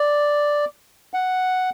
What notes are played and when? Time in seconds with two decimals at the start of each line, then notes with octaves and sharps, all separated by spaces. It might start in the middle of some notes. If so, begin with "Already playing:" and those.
Already playing: D5
1.14 F#5